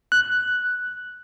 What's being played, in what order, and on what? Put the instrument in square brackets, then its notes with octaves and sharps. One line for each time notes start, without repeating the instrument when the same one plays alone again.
[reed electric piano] F#6